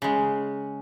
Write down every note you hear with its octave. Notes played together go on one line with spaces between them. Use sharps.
C#3 G#3